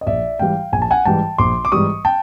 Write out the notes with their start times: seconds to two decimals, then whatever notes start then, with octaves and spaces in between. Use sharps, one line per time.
0.01 D#5
0.07 A#1 D5 E5
0.39 G#2 E3 G3 F5 G5
0.72 A#1 G#5
0.82 A5
0.91 F#5 G#5
1.05 G#2 E3 G3 G5 A5
1.38 A#1 C6 D6
1.65 D6
1.72 G#2 E3 G3 C#6 D#6
2.05 G5 A5